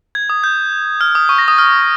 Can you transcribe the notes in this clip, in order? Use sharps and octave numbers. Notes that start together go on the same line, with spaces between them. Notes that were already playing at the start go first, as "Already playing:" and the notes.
G#6
D#6
G6
F6
D#6
C#6
A#6
D#6
F6